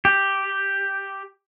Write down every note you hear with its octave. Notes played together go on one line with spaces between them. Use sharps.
G4